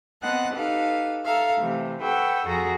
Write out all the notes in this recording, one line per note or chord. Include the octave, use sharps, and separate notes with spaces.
B3 C4 D#5 F#5 A5 F#6
D#4 G4 A4 B4 F5
A4 E5 F5 A#5
C3 E3 A3
A4 B4 F#5 G5 C#6 E6
F2 F#4 G#4 A4 A#5 A#6